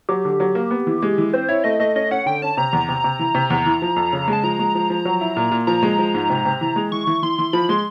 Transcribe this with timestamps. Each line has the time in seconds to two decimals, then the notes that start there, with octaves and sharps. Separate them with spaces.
0.09 F#3 G4
0.25 D3
0.40 F#3
0.55 A#3
0.71 B3
0.87 E3
1.03 G#3
1.18 E3
1.33 C4 C5
1.49 E4 C#5
1.64 A3 D#5
1.80 A3 D#5
1.96 C#4 D#5
2.11 C#4 F#5
2.26 D3 G5
2.42 C#4 A5
2.57 C3 A#5
2.73 E2
2.88 C3
3.04 C3
3.19 E3
3.35 C3
3.50 E2
3.66 E3
3.82 F3
3.96 F2
4.13 C#3
4.28 G#3
4.33 A5
4.43 F3 A#5
4.59 G#3
4.75 F3
4.90 F3
5.05 F#3
5.21 E4
5.37 A#2
5.52 A#2
5.67 F3 A#5
5.83 G#3
5.99 F3
6.14 G#2
6.30 C3
6.45 C3
6.61 E3
6.76 G#3
6.92 E3 C#6
7.07 E3
7.23 E3 C6
7.39 E3
7.53 F3 B5
7.69 G#3 C6